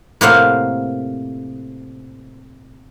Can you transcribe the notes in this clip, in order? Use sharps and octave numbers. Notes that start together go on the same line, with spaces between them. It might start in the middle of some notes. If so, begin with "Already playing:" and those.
A2 C3 A#3 C5 F5 F#5